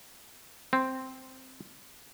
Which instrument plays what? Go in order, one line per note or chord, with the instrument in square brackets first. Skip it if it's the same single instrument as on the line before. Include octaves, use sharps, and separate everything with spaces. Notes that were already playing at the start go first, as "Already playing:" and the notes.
[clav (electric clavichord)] C4